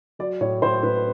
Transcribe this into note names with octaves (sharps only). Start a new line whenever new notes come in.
F#3 D5
A2 C#5
A2 C5
A2 B4